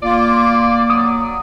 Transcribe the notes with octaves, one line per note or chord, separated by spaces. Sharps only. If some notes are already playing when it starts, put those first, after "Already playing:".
A#3 F4 D5
F#3 D#6